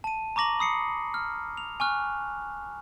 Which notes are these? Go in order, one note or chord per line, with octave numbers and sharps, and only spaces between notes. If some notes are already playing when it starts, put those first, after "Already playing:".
A5 D#7
A#5 C#6 D6 A#6 F#7
B5 D#6 C7 C#7
F6
F7
G#5 C#6 F6 F#6